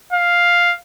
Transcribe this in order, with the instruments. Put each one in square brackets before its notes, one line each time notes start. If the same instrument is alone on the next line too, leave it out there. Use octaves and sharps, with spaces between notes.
[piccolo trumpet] F5